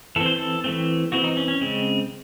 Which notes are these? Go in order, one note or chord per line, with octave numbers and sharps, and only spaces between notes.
E3 C4 A4
C5
A4
E3 A3 C4
E3 C4 F#4
D#4
C#4
C#4
C#3 G#3 C4